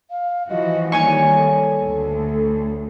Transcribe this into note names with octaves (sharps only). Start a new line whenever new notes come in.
F5
E3 F3 F#4 D#5
D#3 G3 A#3 D#4 C#5 G#5 C#6
A4
D2